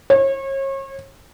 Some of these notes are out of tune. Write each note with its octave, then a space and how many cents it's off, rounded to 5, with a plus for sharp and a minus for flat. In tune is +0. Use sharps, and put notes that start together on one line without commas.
C#5 -35